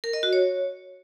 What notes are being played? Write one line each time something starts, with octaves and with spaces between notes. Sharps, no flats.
A#4
D#5
F#4
C#5